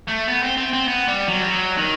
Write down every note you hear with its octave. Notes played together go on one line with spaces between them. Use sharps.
A3
B3
C4
C4
C4
B3
G3
F#3
G3
F#3
D#3